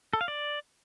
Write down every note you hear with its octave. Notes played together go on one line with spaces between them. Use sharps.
A4
F5
D5